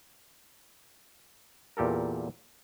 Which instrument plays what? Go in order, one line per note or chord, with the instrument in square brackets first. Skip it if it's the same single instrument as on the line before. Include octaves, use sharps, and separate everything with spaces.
[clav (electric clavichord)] E2 A#2 G4 A4 A#4